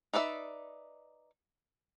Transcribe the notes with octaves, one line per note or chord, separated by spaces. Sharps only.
D#4 B4 D5 E5